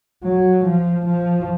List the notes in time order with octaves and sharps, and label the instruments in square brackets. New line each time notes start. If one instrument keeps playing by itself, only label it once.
[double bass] F#3
F3
F3